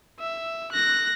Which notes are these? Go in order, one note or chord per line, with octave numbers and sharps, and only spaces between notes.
E5
F#6 A#6